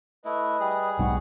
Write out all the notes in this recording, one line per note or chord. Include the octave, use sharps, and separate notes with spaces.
A3 E4 B4 D#5
G3 G#4
B1 G#2 F#4 F#5